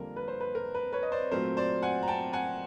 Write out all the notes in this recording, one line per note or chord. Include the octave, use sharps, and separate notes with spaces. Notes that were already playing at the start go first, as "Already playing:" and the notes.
Already playing: F2 D3 G3 A#3 A#4
B4
C5
B4
A#4
B4
B4 C#5
D#5
C5 D5
A#2 F#3 A3 C4 A#4 C5
C5 D5
F#5 G#5
A#5
G5 A5
F#5 G#5